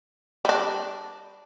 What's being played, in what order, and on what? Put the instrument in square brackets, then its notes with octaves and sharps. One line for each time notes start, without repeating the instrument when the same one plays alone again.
[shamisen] G3 D4